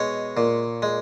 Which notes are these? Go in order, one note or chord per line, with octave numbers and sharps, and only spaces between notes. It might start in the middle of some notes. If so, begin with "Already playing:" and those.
Already playing: B2 G#3 C#5
A#2
G#3